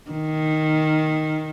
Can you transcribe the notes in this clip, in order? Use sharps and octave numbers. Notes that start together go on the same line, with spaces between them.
D#3